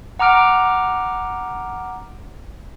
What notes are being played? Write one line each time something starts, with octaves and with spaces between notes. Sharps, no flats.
F#5 A#5 D6 F6 D7